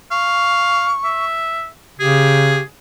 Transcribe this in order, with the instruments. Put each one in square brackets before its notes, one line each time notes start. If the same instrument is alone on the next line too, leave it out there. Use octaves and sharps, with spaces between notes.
[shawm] F5 [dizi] C#6
[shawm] E5
[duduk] C#3 [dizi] G4 [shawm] G#4